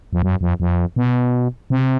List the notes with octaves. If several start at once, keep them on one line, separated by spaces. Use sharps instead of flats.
F2
F#2
F2
F2
B2
C3